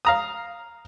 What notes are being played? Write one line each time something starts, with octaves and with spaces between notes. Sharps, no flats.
F5 A#5 D#6